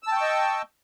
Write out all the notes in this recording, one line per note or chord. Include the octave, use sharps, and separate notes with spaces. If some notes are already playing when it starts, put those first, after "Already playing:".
D#5 G5 A5 C#6 E6